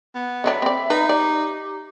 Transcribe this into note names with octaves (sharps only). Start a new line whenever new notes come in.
B3
D3 F#3 D4 E5 B5
C4 D5
D#4 B4
G4 D5